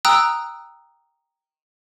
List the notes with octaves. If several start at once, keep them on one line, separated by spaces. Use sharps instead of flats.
G5 A#5 D#6 E6 F#6